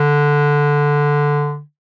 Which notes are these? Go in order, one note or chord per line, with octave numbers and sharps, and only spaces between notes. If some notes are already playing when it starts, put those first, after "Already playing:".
Already playing: D3